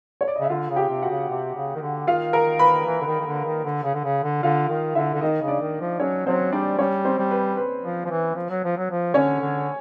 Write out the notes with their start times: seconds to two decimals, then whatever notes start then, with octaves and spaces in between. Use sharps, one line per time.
0.21 C#5
0.28 D5
0.36 D#5
0.40 C#3 E5
0.49 D3 F4 F5
0.70 C#3
0.76 G4 G5
0.89 C3
1.02 F#4 F#5
1.09 C#3
1.29 C3
1.55 C#3
1.75 D#3
1.82 D3
2.07 D#3 F4 F5
2.33 A#4 A#5
2.59 B4 B5
2.86 E3
3.01 D3
3.06 D#3
3.20 D#3
3.25 D3
3.45 D#3
3.64 D3
3.84 C#3
3.94 D3
4.04 C#3
4.24 D3
4.43 D3 F4 F5
4.69 D#3
4.95 D3 E4 E5
5.14 D3
5.21 D#3 D#4 D#5
5.41 C#3
5.48 D4 D5
5.61 D#3
5.81 F3
6.00 F#3 C#4 C#5
6.26 F#3 C4 C5
6.52 G3 D4 D5
6.79 G3 C#4 C#5
7.05 C4 C5
7.19 G3
7.31 B4
7.57 B4
7.83 F3
8.06 F3
8.10 E3
8.36 F3
8.50 F#3
8.64 F3
8.77 F#3
8.91 F3
9.14 D3 C#4 C#5
9.41 D3